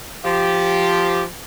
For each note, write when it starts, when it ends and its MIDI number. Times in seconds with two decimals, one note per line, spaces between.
0.25 1.22 53
0.25 1.22 67